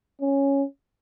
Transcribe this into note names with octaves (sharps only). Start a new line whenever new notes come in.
C#4